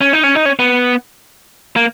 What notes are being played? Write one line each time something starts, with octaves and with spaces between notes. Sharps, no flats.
C#4
D#4
C#4
D#4
C#4
B3
A#3